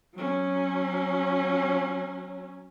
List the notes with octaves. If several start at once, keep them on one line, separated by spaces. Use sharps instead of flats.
F#3 C#4